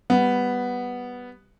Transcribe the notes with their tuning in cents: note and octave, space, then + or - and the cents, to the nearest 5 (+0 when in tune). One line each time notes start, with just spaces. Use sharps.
G3 +0 B3 +0